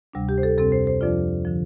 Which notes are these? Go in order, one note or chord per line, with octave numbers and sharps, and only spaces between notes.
D2 C3 G3 D4
G4
C5
A4
F2 C3 G3 C4 A4
C5
C5
F2 F3 D4 F4 D5
D3 F3